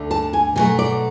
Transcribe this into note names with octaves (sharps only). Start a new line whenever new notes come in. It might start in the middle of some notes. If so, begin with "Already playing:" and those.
Already playing: D2 D3 A3
A5
G#5
B2 F#3 A3 G#5
D5